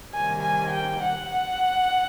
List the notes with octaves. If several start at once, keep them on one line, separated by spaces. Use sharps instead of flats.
C3 D#3 G3 A#3 G#5
G#5
G5
F#5
F#5